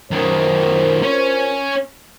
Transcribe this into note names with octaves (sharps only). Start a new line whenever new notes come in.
F#2 D#3 F4 A#4 C5
C#4 C#5